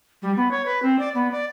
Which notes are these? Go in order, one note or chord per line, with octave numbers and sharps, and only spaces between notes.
G3
B3
C#5
B4
C4
D5
B3
D5